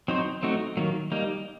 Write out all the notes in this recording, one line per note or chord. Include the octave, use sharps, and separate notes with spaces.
F#3 C4 D#4 F#4 C5
F#3 A3 C4 D#4 F#4
D#3 F#3 A#3
G3 A#3 D#4